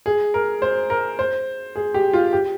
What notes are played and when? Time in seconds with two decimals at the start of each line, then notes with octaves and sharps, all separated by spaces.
0.06 G#4
0.34 A#4
0.62 C5
0.90 A#4
1.19 C5
1.76 G#4
1.94 G4
2.13 F4
2.33 G4